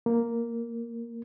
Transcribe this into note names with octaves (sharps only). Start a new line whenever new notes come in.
A#3